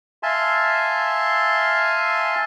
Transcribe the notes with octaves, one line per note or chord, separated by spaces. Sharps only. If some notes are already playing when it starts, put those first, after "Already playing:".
E5 F5 G#5 A5 C6